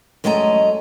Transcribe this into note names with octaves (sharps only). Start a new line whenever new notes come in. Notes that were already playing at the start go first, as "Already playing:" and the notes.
F#2 G#3 A3 D#5 G#5 A#5